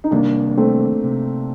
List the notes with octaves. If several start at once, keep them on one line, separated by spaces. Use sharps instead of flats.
D#4
C3 D#3 G3 A#3 D4
A3 C4
C3